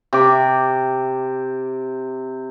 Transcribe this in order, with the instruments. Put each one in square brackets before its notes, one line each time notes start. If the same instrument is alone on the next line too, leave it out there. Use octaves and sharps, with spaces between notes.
[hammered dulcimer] C3 D6